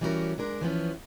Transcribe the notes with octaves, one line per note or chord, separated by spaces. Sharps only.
E3 G3 C#4 D#4 F#4 A#4
G#3 D4 A#4
E3 F3 B3 C#4